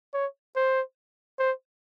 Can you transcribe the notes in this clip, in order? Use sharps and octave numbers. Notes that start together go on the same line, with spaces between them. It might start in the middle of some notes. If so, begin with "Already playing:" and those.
C#5
C5
C5